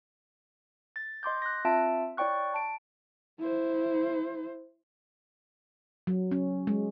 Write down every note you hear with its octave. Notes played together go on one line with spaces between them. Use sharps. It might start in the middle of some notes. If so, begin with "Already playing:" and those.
A6
D#5 C6 D6 G6
F#6 A#6
C4 F4 E5 A5 E6 D7
E4 C#5 D5 G5 C#6 F#6
A5 D7
E4 C5
F#3
C#4
G#3